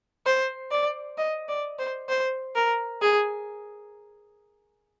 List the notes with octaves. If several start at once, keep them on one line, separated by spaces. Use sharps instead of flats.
C5
D5
D#5
D5
C5
C5
A#4
G#4